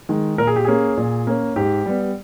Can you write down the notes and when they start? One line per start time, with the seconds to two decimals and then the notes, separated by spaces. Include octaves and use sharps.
0.09 D#3 G#3
0.38 A#2 A#4
0.47 G#4
0.56 G4
0.65 A#3 C#4 G#4
0.97 A#2
1.27 A#3 C#4
1.56 G#2 G4
1.86 G3 B3